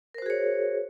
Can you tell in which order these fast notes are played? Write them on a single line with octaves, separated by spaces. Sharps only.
A#4 C5 F#4 G#4 C#5